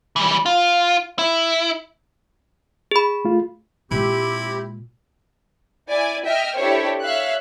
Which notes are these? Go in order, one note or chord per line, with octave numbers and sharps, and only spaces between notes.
E3 G3
F4
E4
G#4 B5
A3 F4
A#2 G#3 C4 E4 G4
E4 D5 G#5
D#5 E5 G5 F6
D4 E4 G4 A4 C5 C#5
C#5 E5 F5 F#6